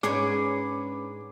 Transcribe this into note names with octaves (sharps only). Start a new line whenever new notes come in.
G#2 B3 C#4 D4 G#4 C#5 D6